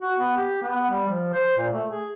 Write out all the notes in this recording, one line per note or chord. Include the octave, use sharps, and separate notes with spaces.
F#4
B3
G4
B3
G3
F3
C5
A#2
A3
G#4